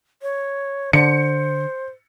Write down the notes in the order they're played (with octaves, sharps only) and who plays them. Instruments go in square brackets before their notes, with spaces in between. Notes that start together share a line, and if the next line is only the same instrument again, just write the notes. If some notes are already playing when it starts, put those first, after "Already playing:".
[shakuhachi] C#5
[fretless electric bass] D3 [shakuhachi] C5 [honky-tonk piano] C#7